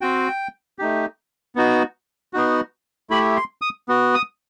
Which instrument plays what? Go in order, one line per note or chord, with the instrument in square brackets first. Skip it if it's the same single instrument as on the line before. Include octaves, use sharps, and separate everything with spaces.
[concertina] C4 F#4 G5
A3 D#4 G4
B3 D#4 F#4
B3 D#4 F#4
A3 E4 G4 B5
C6
D#6
B3 F#4
D#6